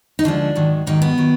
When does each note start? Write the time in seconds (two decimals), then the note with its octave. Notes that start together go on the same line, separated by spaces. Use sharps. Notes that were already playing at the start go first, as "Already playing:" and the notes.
0.19 D#4
0.24 D2 D3 F3 G#3 D4
0.55 G#2 D#3 F#3
0.87 G#2 D#3 F#3 D#4
1.02 B3
1.18 D#3 F#3